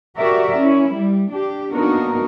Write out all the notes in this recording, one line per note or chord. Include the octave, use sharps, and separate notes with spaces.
F#4 G4 A#4 D5 E5
C#4 E4
G3
D4 G4
A#3 B3 D4 D#4 F#4 A#4